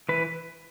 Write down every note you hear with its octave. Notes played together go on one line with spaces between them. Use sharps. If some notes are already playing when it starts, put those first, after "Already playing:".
E3 B4